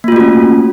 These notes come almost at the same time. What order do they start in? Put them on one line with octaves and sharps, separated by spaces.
A#3 F4 A3 F#4 C#4